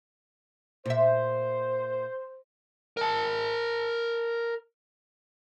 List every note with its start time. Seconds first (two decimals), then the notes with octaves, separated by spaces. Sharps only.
0.86 A#2 C5 E5
2.97 A#4 A5